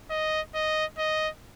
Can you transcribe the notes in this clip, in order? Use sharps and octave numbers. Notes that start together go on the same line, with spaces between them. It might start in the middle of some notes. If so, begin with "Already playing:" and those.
D#5
D#5
D#5